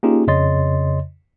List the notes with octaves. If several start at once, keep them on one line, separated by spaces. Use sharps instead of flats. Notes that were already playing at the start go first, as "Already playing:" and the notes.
A#3 C#4 D#4 F4 G4 G#4
F2 C#3 C#5 D#5 C6 A6